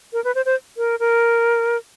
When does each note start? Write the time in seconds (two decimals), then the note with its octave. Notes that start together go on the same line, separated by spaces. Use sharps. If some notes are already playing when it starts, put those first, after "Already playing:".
0.13 A#4
0.24 B4
0.35 C5
0.46 C5
0.77 A#4
1.00 A#4